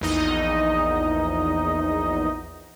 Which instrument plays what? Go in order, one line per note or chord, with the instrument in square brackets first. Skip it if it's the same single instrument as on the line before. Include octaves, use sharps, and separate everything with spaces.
[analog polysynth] A#1 E2 D#4 D#5